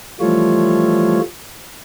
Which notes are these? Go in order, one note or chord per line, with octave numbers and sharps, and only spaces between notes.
E3 F3 G3 A3 F4 C#5